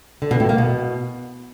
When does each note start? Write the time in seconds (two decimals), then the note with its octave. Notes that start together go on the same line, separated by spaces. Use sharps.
0.22 D3
0.31 B2
0.40 A2
0.49 A#3
0.58 B2